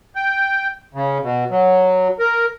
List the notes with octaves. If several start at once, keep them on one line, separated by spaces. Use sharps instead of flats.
G5
C#3
B2
F#3
A#4